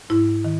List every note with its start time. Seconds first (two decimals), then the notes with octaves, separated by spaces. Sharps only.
0.10 G#2 E4
0.45 D#3